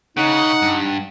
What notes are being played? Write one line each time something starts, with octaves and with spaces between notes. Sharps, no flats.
C#3 D#4 F#5
G2